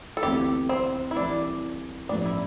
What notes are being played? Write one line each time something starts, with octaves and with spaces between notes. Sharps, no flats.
A4
D2 C3 E3 B3 G4
C4
E4
C2 C3 E3 D4
A1 G2 F3 B3 D4
E4